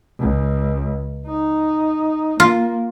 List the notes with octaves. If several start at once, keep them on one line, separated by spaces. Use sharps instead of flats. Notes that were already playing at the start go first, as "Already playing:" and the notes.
C#2
D#4
A#3 F4